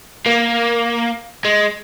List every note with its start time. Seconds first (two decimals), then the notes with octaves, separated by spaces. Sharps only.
0.26 A#3
1.45 G#3